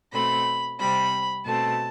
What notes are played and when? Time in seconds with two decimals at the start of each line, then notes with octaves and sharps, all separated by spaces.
0.12 B2 A3 C4 B5
0.79 C3 G3 C4 B5
1.45 B2 A3 C4 A5